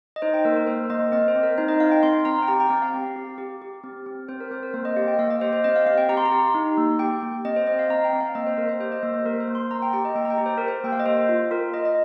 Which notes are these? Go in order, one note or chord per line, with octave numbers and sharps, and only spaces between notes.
D#5
D#4 C5
G5
A#3 A#4
A#4
A#3 C5
A#3 D#5
C4 D#5
C5
C4
A#4
D#4 C5
D#5
D#4 F5
G5
C4 C6
C4 A#5
G5
G4 A#5
G5
C4 G5
F5
C4
G4
G4
G4
C4
C4
C4 C5
A#4
C4 C5
A#4
A#3 C5
D#5
G4 F5
G5
D#5
A#3 F5
D#5
G4 C5
C5
C4 D#5
F5
C4 F5
G5
G4 A#5
C6
A#5
G4
D#4
A#3
G4 G5
A#3
C4 D#5
C5
C4 D#5
F5
C4 A#5
G5
C4
F5
A#3 D#5
C5
A#3 A#4
C5
G4 C5
D#5
A#3 C5
C5
A#3 A#4
C5
A#3
C6
A#3 A#5
G5
G4 G5
D#5
A#3 G5
A#5
G5
G4
C5
G4 A#4
C5
A#3 G5
F5
D#5
A#3 C5
F4
F4 A#4
F4 D#5
D#5